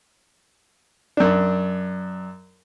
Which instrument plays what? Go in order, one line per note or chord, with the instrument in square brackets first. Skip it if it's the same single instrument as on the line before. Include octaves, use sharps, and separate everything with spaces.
[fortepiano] F#2 D4